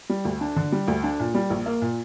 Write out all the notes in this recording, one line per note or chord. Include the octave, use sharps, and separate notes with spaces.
G3
D2
D4
D3
G3
D2
D4
A#2
G3
A#1
A#3
A#2